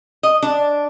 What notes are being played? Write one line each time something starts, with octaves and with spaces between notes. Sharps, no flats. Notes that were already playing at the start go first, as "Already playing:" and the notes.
D#5
D4